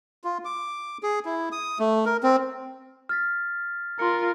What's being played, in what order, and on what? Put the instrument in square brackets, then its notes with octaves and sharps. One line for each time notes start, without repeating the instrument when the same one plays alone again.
[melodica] F4
D6
G#4
E4
D#6
A3
A#4
C4
[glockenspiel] F6 A6 B6
[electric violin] F4 A#4 [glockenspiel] C6 C#7